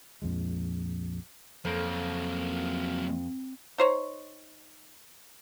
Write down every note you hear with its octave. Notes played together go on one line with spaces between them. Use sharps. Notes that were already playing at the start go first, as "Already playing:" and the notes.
A#1 F2 F3 G#3
F2 F#3 A#3
D#4 C5 C#5